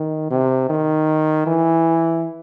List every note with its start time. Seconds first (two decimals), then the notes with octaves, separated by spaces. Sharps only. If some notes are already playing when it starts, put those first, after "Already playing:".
Already playing: D#3
0.31 C3
0.70 D#3
1.46 E3